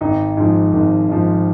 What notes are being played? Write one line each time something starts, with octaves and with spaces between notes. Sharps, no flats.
G#1 D#4
G#2 F3
G#1
G#2 F3